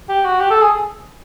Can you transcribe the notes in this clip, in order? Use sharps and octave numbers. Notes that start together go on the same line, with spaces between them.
G4
F#4
G4
A4
G#4